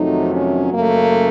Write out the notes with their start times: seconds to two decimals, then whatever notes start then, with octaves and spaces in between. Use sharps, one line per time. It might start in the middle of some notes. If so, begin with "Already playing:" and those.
Already playing: F2 C3 D#3 F#3 A3 D#4
0.33 C#4
0.73 F#2 C#3 A3 A#3